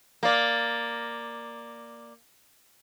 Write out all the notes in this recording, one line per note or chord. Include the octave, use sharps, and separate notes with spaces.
A#3 D5